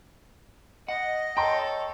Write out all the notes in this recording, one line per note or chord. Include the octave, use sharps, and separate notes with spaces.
D#5 F#5
A4 C#5 G5 A#5 C6